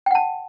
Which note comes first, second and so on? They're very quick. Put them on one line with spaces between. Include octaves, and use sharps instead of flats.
G5 F#5 A5